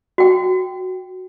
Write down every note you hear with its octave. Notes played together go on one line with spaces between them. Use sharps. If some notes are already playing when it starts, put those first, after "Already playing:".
F#4 G5